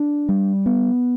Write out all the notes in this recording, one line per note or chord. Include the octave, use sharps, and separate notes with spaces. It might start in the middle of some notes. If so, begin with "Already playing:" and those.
Already playing: D4
G3
B3